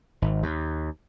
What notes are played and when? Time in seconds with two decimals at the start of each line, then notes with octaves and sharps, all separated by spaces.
0.22 G#1
0.43 D#2